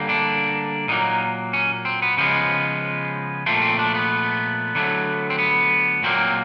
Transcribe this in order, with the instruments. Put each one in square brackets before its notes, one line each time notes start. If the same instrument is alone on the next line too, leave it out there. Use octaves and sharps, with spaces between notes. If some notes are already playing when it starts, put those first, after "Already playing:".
Already playing: [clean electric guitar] D3 G3 A#3
D4
A#2 F#3 A#3 D#4
C#4
C4
B3
C#3 F3 G#3 B3
A#2 F3 A3 C4
C4
D4
B3
D3 F#3 A3
C4
B3
A#2 F#3 A#3 C4